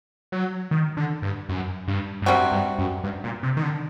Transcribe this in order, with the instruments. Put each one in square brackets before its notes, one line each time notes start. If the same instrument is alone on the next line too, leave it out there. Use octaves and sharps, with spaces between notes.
[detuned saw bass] F#3
D#3
D3
G2
F#2
G2
G2
[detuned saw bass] F#2 [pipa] C3 G3 C4 F#4
[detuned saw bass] G2
F#2
G2
A#2
C3
D#3
D3